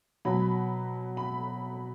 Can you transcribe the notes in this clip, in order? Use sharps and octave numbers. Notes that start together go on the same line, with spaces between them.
B2 F#3 B5
B5